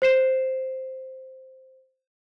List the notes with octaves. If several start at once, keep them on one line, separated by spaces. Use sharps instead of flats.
C5 C7 E7